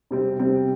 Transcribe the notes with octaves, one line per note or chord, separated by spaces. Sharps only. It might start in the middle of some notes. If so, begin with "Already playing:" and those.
C3 G3 C4
C3 G3 C4